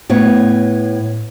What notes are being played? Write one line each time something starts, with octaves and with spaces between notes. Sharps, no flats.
A2 B3 C#5